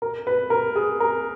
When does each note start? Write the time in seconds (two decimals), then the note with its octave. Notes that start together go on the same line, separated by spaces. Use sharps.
0.02 A#4
0.27 B4
0.50 A#4
0.76 G#4
1.00 A#4